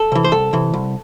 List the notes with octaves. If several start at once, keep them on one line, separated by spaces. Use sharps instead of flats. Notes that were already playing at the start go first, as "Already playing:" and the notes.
Already playing: A4
C3 E3
C5
C2 A4
C3 E3
C2